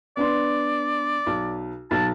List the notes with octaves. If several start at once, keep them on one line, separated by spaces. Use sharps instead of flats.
B3 D4 D5 C6
B1
B1 A5